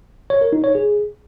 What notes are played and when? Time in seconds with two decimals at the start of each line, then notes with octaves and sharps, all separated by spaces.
0.30 C#5
0.41 A#4
0.53 D#4
0.64 C#5
0.75 G#4